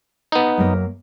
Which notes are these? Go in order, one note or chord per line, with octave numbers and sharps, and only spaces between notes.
B3 D#4
F#2 A#3